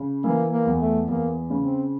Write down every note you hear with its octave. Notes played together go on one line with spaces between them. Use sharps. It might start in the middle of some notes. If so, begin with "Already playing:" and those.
Already playing: C#3
E3 A#3
A#3
E2
A3
E2 A#3
C#3
C4